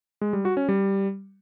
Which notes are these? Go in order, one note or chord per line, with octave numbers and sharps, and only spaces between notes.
G#3
G3
F#4
C#4
G3